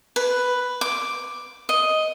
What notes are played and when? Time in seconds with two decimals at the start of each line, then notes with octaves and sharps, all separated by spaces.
0.16 B4
0.81 D6
1.69 D#5